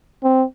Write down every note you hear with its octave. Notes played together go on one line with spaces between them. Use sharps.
C4